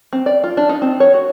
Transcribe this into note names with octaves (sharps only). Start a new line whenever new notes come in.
C4
D5
F4
D4
D#4
C4
C#5
F#4